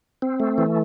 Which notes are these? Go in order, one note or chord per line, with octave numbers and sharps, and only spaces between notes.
C4
A3
E3